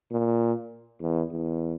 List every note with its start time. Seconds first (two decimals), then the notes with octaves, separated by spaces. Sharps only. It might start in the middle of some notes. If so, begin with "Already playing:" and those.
0.11 A#2
1.01 E2
1.32 E2